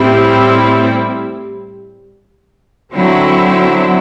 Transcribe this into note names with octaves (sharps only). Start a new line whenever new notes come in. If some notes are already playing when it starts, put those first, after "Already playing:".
Already playing: A2 G3 C4 E4
D3 F#3 C4 E4